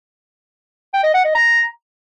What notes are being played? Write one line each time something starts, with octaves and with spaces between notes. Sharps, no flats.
G5
D#5
F#5
D#5
A#5